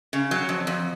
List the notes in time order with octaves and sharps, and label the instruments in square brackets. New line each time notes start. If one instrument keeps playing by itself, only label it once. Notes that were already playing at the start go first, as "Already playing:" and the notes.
[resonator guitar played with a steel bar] C#3
F#3
F2
F2